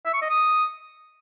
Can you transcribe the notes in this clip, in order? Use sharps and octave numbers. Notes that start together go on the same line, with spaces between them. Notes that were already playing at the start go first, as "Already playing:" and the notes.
E5
C#6
D#5
D#6